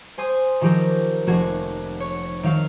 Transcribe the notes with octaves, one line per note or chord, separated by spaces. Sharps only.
C5 G#5 C6 D#6
D#3 F3 F#3 G4 A#4
F1 A#3 F#4 G#6
C#5
D#3 F#3 F5